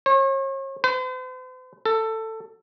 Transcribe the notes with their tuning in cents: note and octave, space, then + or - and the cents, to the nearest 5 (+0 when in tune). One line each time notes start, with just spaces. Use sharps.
C#5 -40
C5 -45
A4 +15